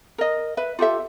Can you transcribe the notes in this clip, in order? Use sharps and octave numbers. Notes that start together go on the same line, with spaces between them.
A#4 D#5
B4 E5
F4 G4 A4 E5